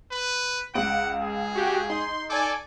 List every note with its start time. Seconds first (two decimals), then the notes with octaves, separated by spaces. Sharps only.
0.11 B4
0.74 C#2 F5 F#5 D7
1.22 G#4
1.55 F#4 G4
1.90 D#4 C6
2.30 A4 D5 G#5 D6